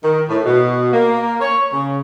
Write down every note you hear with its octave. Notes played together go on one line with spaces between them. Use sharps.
D#3
A2
B2
A#3
C#5
C#3